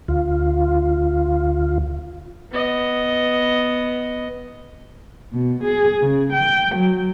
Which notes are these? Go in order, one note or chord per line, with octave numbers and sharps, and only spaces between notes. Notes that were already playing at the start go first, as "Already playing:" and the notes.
D2 F4
B3 D#5
B2
G#4
C#3
G5
F#3